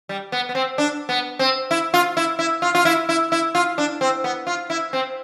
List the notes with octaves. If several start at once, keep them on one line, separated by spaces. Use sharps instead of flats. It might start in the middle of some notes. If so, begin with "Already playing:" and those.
G3
B3
B3
C4
D4
B3
C4
E4
F4
E4
E4
F4
F4
E4
E4
E4
F4
D4
C4
B3
F4
E4
C4